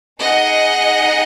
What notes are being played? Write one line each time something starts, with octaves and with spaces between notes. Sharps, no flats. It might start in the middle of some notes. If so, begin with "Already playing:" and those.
D#4 G#4 D#5 F#5